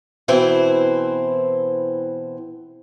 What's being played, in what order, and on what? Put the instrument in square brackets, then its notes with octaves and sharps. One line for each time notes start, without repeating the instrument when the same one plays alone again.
[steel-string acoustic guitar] B2 E3 C4 E4 C5